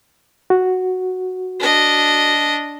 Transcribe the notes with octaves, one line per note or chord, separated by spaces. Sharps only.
F#4
D4 D#5